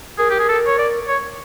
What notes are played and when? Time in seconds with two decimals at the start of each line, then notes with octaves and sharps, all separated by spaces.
0.18 G#4 A#4
0.30 G4
0.40 G#4
0.49 A4
0.67 C#5
0.79 D5
1.08 C#5